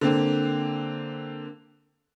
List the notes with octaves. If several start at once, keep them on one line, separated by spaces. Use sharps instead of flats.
D3 A#3 C4